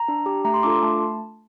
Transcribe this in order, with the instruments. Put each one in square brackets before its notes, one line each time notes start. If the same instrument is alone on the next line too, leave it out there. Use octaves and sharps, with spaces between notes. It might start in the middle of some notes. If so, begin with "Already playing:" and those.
Already playing: [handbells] A#5
D4
G4
A3 A#5
C6
D4 F4 A4 D6
C6
A3 A5